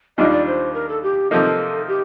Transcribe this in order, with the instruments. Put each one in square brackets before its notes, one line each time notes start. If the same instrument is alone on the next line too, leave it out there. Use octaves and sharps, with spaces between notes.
[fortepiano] D#2 D#3 G3 D4 F4 [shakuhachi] D#5
[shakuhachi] D5
C5
A#4
A4
G4
[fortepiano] C3 F3 A#3 D#4 [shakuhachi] A4
[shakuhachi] G4